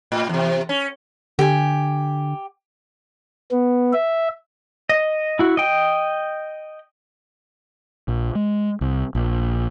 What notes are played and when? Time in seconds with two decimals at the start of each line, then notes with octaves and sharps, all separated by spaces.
0.12 A2
0.29 E2 C3
0.69 C#4
1.39 D3 G4 G#5
3.51 B3
3.93 E5
4.89 D#5
5.39 E4 F#4
5.57 D#5 G5
8.08 A#1
8.35 G#3
8.81 C2
9.15 A#1